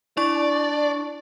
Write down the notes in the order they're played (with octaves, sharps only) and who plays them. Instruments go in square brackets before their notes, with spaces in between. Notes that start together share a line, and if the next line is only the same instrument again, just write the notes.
[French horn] D4 [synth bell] E4 C#6 [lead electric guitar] D5